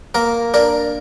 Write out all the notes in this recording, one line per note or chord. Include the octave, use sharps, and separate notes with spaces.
A#3 A#4
D4 A#4